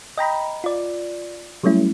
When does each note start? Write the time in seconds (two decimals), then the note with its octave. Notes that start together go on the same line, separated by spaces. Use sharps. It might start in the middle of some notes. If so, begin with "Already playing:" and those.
0.17 D#5 G5 A#5 B5
0.64 F4 D5
1.63 F#3 G3 A3 C#4 E4